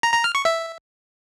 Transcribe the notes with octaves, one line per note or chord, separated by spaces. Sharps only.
A#5
A#5
F6
C#6
E5